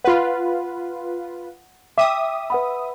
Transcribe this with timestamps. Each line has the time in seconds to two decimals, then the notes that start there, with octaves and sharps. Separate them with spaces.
0.04 F4 B4 F#5
1.98 E5 G5 D6 D#6
2.50 B4 F#5 B5